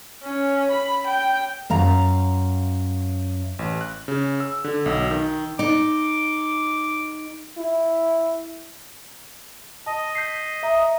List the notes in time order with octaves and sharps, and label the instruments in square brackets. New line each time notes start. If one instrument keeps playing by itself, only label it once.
[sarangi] C#4
B5
G5
[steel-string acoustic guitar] F#2 F5 A#5
[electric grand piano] A1
F#6
C#3
E6
D3
B1
D#3
[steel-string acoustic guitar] D#4 [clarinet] D6
[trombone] E4
[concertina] D#5 [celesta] A5
[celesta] G6 B6 C7
E5 A#5 D#6